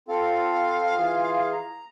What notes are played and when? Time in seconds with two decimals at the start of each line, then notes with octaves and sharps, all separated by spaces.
0.08 C4 F4 A4 F5
0.97 E3 F4 G#4
1.53 A#5